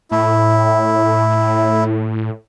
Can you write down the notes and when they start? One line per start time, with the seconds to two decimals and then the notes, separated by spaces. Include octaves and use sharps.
0.11 A2 E4